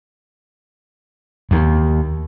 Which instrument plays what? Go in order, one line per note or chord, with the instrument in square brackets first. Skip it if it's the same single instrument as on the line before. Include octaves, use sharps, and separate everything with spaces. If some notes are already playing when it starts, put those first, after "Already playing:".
[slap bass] D#2